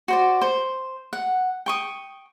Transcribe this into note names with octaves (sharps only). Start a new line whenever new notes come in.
F#4 C5 D5
C5
F#5
G5 C#6 D#6